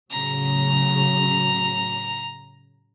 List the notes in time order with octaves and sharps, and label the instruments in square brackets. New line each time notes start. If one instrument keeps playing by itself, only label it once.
[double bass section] A2 C#3 F#3 [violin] A#5